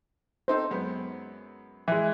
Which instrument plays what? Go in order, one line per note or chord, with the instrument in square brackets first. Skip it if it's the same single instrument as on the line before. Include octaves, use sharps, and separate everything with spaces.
[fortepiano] C4 D#4 A4 [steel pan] C5
[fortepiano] F#2 G#3 B3
[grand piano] E3 G#3